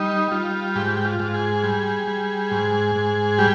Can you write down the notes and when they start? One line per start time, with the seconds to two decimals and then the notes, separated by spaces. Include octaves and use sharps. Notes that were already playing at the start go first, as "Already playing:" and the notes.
Already playing: G3 D#4
0.31 G3 F4
0.75 G#2 G4
1.05 F4
1.20 G#2
1.34 G#4
1.63 G3
2.07 G3
2.51 G#2
2.95 G#2
3.38 G3 G4